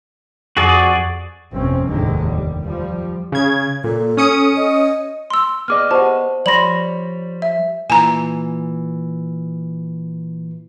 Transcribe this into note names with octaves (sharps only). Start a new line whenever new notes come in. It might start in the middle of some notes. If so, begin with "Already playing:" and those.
F2 F#4 G#4 D5
G1 F2 C3 C4 C#4
F1 D#2 A2 D3 D#3 G#3
G3
F3 G3
C#3 G#6
A#2 A4
C#4 D#6 C#7
D#5
C6 E6
B3 G#4 D5 D#5 D6 F6
F4 G4 C5 F#5 A5
F3 G3 C#5 D5 B5 C6 A#6 F#7
E5
A#2 E3 G#5 A#5